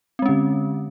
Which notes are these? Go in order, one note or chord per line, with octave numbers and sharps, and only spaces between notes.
D3 G#3 C4 C#4